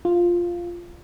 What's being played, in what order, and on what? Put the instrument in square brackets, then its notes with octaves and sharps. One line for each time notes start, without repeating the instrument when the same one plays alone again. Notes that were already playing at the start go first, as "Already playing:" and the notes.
[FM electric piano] F4